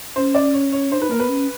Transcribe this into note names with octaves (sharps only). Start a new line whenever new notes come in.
C#4 C5
D5
C#5
C#5
D4 C5
D#4 B4
A#3 A#4
B3 B4
C#4